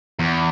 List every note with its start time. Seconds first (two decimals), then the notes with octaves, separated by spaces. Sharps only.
0.19 E2